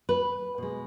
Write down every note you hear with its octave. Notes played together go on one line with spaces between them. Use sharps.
B4
B2 G#3